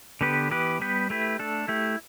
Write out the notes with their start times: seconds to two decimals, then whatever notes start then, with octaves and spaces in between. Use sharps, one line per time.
0.21 D3 B3 G4 B4
0.51 E3 B3 G4 B4
0.80 G3 B3 G4 B4
1.10 A3 E4 G4 B4
1.39 A3 D4 A4
1.68 A3 E4 G4